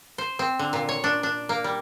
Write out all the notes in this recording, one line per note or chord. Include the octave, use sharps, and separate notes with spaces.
C5
C4
D3
A#2
C#5
D4
D4
A#3
G3